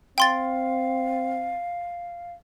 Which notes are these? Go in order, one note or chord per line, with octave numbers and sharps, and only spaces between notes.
C4 F5 G5 C6 A6